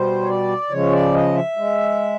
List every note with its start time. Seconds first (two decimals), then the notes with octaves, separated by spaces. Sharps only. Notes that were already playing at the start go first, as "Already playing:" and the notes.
Already playing: B2 G3 C5
0.23 C#5
0.28 D5
0.70 C#3 F3 G#3 C#5
0.92 D5
1.14 D#5
1.35 E5
1.57 G#3